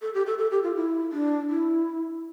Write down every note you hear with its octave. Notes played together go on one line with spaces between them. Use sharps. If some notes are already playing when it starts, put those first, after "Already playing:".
A4
G4
A4
A4
G4
F4
E4
D4
E4